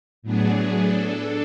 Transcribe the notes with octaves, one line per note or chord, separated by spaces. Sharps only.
A2 F#3 B3 D4 G#4
D4 A4